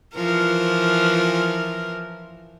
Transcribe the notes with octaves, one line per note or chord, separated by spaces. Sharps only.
E3 F3 A#4